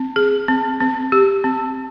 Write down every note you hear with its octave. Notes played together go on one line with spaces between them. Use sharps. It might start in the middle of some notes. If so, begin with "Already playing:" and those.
Already playing: C4
G#4
C4
C4
G4
C4